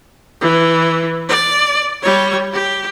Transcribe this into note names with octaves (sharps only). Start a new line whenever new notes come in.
E3
D5
G3 C#5
G4